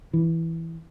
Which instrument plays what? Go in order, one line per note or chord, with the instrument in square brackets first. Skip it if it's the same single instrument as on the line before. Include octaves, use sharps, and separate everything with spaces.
[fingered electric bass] E3